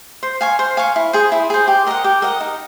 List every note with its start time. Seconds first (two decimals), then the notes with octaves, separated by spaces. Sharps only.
0.23 C5
0.41 F5 G#5 C#6
0.59 C5
0.77 F5 G#5 C#6
0.96 E4
1.13 G#4 C5
1.32 E4
1.50 G#4 C5
1.68 G4
1.87 A#4 D#5 F#5
2.04 G4
2.22 A#4 D#5 F#5
2.41 D#4